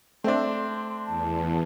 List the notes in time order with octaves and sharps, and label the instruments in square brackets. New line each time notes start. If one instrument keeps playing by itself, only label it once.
[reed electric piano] A3 E5 [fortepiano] C4 D4 [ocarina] C6
[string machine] E2 [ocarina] A5